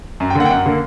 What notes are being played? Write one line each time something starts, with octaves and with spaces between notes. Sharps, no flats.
F#2
G5
D3 A#3 F#5
G5
F#2 F#5
D3 A#3